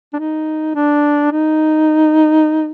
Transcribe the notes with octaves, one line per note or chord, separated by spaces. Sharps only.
D4
D#4
D4
D#4